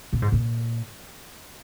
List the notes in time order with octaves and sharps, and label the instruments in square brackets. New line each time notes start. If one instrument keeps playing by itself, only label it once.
[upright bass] A#2
G#2
A#2